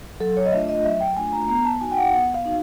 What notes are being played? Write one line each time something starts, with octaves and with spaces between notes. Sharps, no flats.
F#3 A4
C#5
D#5
A3 D4 F4 E5
D#5
F#3 E5
G5
A3 D4 F4 G#5
A#5
B3 A#5
A5
D#4 F#4 G#5
G5
F#5
B3 F#5
F5
D#4 F#4